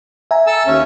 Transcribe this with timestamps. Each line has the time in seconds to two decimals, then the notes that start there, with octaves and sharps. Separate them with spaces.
0.31 E5 G#5 A#5
0.47 A4 A5 E6
0.67 D#2 C#4